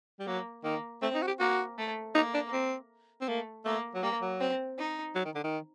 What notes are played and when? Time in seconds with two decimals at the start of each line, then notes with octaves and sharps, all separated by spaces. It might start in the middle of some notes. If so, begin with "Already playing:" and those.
0.20 G3
0.27 F#3 A#3
0.64 D#3 A#3
1.02 A3 C4
1.15 D#4
1.22 F#4
1.27 G4
1.40 A#3 F#4
1.78 A3
2.15 A#3 D#4
2.34 D4
2.53 C4
3.21 C4
3.28 A3 A#3
3.65 A3 A#3
3.95 F#3
4.03 G3 A#3
4.22 F#3
4.40 C4
4.78 D#4
5.15 F#3
5.25 D#3
5.35 D3
5.44 D#3